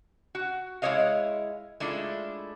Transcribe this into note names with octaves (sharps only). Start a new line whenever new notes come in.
F#4
G#3 E4 G4 C#5 D#5 F5
G#3 A3 D4 E4 F4